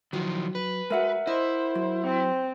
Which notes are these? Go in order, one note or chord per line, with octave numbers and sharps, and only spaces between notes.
D#3 F3 F#3
B4
G#3 F#4 A#4 E5 F#5
E4 C5 D#5
F#3
C4